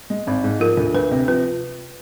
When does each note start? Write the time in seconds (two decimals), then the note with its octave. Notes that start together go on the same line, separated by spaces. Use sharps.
0.10 G#3
0.27 G#1
0.44 G#2
0.60 F3 A#4
0.77 D2
0.95 D2 B4
1.11 C3
1.28 F3 B4